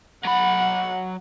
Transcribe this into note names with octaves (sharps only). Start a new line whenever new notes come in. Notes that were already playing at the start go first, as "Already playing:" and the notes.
F#3 F#5 B5